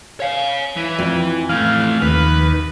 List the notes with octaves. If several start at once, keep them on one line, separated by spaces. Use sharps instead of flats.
C#5 F5
E3
F2
E3 A3 F5
D#2 B4